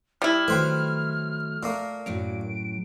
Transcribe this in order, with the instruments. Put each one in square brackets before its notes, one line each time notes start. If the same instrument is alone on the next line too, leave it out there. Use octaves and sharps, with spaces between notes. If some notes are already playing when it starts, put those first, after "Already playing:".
[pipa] G3 E4 [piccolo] F6
[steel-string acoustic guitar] D#3 F#3 A3 [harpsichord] B4 C5 G5
[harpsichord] A#2 A3 A#3 [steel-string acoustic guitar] A#4
[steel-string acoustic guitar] F#2 A2 F#3 [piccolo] D7